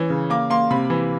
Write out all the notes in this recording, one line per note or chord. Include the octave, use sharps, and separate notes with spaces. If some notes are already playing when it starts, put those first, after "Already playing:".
Already playing: E3 C#4
C#3
A#3 D6
A#3 C6
C3 B5
E3